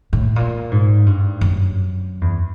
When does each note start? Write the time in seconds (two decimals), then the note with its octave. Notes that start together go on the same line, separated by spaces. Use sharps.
0.13 A2
0.36 A#2
0.71 G#2
1.06 G2
1.41 F#2
2.21 E2